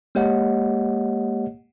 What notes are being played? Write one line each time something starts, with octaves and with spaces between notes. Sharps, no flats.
G#3 A#3 G4 C#5 D#5 F#5